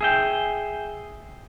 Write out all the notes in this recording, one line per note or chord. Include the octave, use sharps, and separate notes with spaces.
G#4 E5 G5